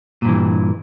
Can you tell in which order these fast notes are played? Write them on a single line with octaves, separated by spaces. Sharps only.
A#2 G2 E3